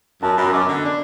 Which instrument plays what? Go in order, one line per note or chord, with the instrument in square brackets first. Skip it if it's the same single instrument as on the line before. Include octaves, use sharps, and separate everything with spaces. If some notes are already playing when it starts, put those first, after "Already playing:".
[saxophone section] F#2 [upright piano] A5
[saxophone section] F#2 [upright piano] B5
[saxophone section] F#2 [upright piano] D6
[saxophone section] D3
D4